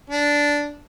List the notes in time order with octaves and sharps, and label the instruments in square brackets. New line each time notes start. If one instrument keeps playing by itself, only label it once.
[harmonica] D4